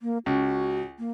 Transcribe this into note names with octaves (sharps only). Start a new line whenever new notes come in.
A#3
C#2 F#4
A#3